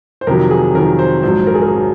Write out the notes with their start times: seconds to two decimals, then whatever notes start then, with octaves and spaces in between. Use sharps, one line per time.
0.21 C5
0.27 F2 C3 D#3 F#3 A#4
0.51 G#4
0.75 F2 C3 D#3 F#3 A#4
0.99 C5
1.23 A#1 G#2 F#3 C5
1.47 A#4
1.55 G#4
1.62 A#4
1.76 F#3